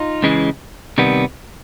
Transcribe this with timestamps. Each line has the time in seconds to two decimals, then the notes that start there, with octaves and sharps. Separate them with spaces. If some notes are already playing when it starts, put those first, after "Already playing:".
Already playing: D#4 F4
0.23 C#2 C#3 E3 G#3
0.98 C3 D#3 G3 B3